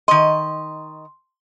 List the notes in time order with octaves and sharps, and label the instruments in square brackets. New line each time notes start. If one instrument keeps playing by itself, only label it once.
[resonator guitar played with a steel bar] D#3 D#5 [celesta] C6